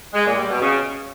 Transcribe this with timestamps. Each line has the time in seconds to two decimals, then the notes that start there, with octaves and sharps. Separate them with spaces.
0.13 G#3
0.25 A#2
0.37 G3
0.49 B2
0.61 C#3